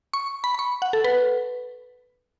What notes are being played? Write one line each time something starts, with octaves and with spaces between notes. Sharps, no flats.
C#6
B5
B5
C#6
F#5
A4
B4